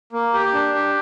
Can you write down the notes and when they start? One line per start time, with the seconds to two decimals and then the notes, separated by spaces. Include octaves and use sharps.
0.13 A#3
0.34 G4
0.54 D4
0.75 G4